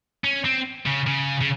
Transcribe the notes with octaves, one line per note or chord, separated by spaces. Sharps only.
C#4
C4
C#3
C#3
C#3